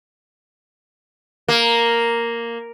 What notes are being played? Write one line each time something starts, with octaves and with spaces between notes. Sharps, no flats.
A#3